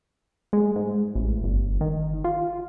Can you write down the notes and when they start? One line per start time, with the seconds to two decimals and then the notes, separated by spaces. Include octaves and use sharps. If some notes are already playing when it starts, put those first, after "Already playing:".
0.53 G#3
0.76 G#2
1.15 A1
1.44 G1
1.81 D#3
2.24 F4